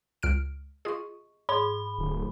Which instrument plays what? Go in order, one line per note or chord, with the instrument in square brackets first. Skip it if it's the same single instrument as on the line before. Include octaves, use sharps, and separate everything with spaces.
[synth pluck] C#2 F6 D7
[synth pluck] F4 G#4 [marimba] D#5 C#6
[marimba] G#2 G#4 [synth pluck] C#5 [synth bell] B5
[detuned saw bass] D1